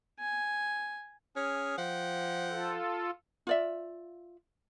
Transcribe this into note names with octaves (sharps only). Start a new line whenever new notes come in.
G#5
C#4 G#4 F6
F3 F#5 G5
F4 A4
F4 D5 E5